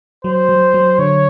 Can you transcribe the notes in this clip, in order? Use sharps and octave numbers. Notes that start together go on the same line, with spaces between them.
F#3 C5
F#3
F#3
D3 C#5